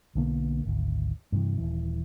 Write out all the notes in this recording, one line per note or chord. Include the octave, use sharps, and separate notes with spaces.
B1 D3 A#3 B3
G#1 D2
G2 C3 E3
D#1 E3